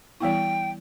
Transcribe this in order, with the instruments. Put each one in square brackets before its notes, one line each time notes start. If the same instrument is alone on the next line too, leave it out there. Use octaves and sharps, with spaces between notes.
[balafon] E3 G3 B3 E4 [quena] G5